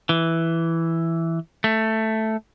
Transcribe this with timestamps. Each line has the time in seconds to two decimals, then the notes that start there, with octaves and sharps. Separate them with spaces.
0.09 E3
1.64 A3